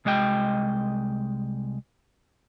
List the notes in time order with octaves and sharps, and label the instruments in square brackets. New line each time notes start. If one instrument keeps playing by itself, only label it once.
[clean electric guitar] C2 G#3 D#5 G5